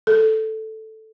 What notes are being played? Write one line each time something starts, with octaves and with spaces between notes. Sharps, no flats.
A4